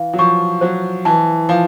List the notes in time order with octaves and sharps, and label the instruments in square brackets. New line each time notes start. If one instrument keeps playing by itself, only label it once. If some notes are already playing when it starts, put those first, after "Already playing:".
Already playing: [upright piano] E3 [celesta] F5
[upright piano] F#3
[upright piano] F3 [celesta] C#6
[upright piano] F#3 [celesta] C5
[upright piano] E3 [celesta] A5
[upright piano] F3 [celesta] F5